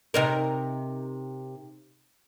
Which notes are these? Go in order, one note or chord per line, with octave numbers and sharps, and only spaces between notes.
C3 D#4 A#4